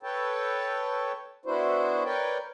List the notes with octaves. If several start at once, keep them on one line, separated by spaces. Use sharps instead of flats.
A4 B4 C#5 G5 A5
B3 D4 E4 F#4 C5
A#4 B4 C#5 D5 G5